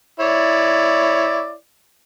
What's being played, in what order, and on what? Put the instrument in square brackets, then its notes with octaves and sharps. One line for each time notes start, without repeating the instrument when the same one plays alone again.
[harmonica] E4 C#5 D5